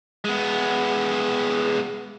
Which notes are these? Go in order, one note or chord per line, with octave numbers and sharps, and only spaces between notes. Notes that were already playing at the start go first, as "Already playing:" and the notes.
G#3 B3